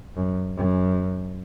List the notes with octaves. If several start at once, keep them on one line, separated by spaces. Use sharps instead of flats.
F#2
F#2